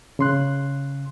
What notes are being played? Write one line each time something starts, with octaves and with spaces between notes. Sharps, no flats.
C#3 C6 F#6